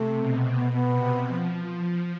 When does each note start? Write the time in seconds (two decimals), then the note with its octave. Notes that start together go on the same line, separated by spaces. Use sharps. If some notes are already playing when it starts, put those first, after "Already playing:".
Already playing: C3 A3
0.19 B2
0.56 B3
0.73 B3
0.91 C3
1.27 F3